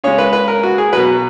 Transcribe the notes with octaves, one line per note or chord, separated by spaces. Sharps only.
C#3 G#3 C#5
B4
B4
A#4
F#4
G#4
B2 F#3 B4